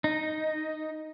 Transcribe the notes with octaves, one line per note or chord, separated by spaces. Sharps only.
D#4